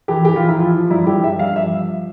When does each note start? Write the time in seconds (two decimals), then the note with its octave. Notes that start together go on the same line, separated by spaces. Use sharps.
0.08 E3 G4
0.25 E3 G4
0.36 F3 F4
0.48 E4
0.58 F3 F4
0.74 F3
0.91 G2 E4
1.07 G2 G4
1.24 G3 E5
1.39 G2 F5
1.56 F3 E5
1.72 F3